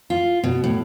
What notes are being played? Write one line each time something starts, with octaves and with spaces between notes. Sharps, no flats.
F4
B2
A2